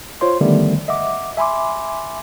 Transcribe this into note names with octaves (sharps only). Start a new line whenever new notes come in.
F4 C5 C#5 C6
D3 D#3 F3 G3 A3 B3
D#5 E5 F#5 D6
E5 G#5 B5 C6 D6